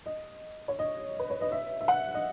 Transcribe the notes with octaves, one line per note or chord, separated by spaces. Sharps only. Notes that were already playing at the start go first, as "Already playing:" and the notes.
D#5
C#5
D#5
B4
C#5
D#5
E5
E5
F#5
D#5